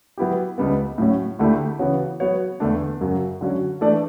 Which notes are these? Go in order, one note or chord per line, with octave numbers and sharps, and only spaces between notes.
F#3 B3 E4 G4
C#2 C#3 G3 B3
A2 F#3 C#4
D2 D3 A3 E4 G4
C#3 E3 B3 F#4 C#5
F#3 B3 F#4 C#5
E2 D3 A3 D4
F#2 C#3 F#3
D3 F#3 C#4 F#4
E3 A3 D4 A4 D5